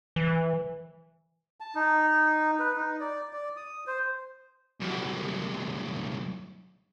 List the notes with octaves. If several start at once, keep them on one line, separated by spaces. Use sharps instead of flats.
E3
A5
D#4
B4
D#4
D5
D5
D#6
C5
C2 F#2